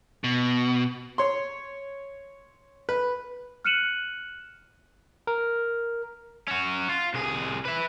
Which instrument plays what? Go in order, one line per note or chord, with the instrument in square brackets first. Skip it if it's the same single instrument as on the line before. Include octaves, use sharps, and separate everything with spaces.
[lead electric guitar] B2
[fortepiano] C#5 C6
B4
[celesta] F6 F#6 C#7 D#7 E7 F#7
[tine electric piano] A#4
[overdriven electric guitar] C#4 F#4
F4
C2 G#4
B4 E5